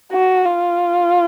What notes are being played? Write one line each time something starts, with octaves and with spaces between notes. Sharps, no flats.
F#4
F4